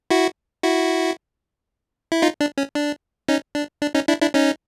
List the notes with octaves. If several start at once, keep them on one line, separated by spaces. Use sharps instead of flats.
E4 F#4
E4 F#4
E4
D#4 F4
D4
C#4
D4
C#4 D#4
D4
D4
C#4 D#4
D4 E4
D4 E4
C#4 D#4